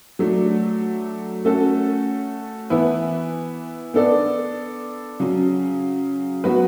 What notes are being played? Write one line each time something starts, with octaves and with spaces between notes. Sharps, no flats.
F#3 A3 D4
A3 C#4 F#4 A4
E3 B3 E4 B4
B3 D4 A4 D5
C#3 F#3 C#4
F#3 B3 F#4 B4